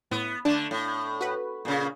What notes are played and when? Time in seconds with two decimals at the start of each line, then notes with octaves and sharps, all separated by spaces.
0.11 A2 B3
0.45 D3 A3 D4 A5
0.71 A2
1.21 F#4 B4
1.65 A#2 C#3